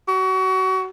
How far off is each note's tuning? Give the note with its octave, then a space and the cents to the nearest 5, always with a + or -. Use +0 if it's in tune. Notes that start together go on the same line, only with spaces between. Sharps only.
F#4 +30